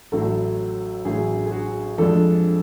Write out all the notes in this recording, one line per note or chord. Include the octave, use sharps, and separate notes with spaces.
A1 A2 F#3 A4
A1 A2 F#3 G#4
G#4
F#4
F2 F3 G#3 D4 A4